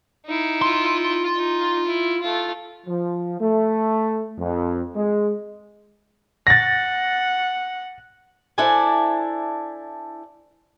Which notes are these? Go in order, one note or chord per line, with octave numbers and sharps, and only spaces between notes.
D#4 E4
F4 C6
D#4
E4
A3 F4
F3
A3
F2
G#3
F#5 A6 A#6
D4 E4 A4 C5 D5 G#5